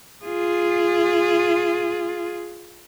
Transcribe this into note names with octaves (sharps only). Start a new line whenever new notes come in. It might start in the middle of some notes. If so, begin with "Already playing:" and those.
F4 G#4